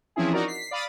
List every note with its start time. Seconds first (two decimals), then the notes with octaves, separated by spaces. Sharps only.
0.16 E3 F3 C4 C#4 E4 G#4
0.33 D#4 F#4 A#4 D5 A#5
0.48 B6 C7
0.71 D5 F5 B5 D#6 A6